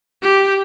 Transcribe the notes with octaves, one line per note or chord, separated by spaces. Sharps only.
G4